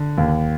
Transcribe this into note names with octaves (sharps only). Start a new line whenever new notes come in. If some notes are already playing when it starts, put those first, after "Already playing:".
Already playing: D3
D#2